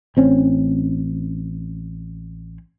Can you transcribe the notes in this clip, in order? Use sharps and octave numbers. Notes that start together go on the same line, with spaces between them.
A1 C4 C#4